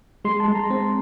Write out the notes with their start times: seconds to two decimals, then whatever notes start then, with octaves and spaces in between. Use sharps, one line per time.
0.25 G#3 C6
0.40 A5
0.48 G#3
0.55 A#5
0.70 C4